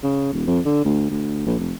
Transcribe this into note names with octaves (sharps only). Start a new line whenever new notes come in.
C#3
D#1
F2
D3
D2
D2
A#1
F1